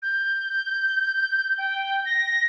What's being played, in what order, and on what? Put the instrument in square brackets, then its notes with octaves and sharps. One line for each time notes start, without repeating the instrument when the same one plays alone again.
[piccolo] G6
G5
A#6